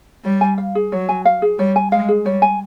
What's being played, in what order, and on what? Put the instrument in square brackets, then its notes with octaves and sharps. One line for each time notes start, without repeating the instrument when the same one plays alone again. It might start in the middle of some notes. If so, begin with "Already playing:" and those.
[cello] G3 [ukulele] C#5
[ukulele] G#5
F5
G#4
[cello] F#3 [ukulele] C#5
[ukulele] G#5
F5
G#4
[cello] G3 [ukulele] C#5
[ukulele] G#5
[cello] G#3 [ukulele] F5
[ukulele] G#4
[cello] G3 [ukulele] C#5
[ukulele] G#5